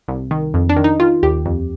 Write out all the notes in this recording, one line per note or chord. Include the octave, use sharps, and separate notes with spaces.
C2
D#3
F2
D4
D#3
D#4
D#3 F4
D#2 G4
F2